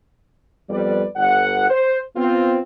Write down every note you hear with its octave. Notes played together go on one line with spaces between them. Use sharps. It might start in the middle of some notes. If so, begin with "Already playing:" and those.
F2 G3 B3 B4 D5
G1 F#5
C5
B3 C4 F4